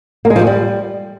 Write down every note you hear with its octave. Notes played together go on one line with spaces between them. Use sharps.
A#3
G#3
F3
G#3
G3